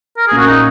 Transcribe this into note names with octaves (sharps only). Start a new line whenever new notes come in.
A#4
A#2 A#3 C#4 G#4
F#4
D#4